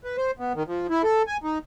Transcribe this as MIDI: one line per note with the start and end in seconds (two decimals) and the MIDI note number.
0.04 0.17 71
0.17 0.31 72
0.39 0.53 59
0.55 0.63 51
0.68 0.87 53
0.90 1.02 64
1.03 1.22 69
1.27 1.37 80
1.44 1.58 63